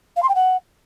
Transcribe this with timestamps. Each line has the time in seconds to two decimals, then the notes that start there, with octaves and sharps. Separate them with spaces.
0.16 F5
0.22 C6
0.29 G5
0.35 F#5